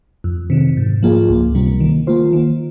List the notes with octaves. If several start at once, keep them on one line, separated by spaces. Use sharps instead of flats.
F2
C3 D#3
G#2
F3 A#3 F4 G#4
C#2
C3 G3 A#3
D#3
A#3 F4 C5
D#3